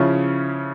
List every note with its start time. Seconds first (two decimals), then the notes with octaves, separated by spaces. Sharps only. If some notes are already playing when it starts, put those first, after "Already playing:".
Already playing: C#3 F3 C#4 E4